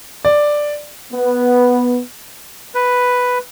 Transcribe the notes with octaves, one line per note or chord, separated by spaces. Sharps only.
D5
B3
B4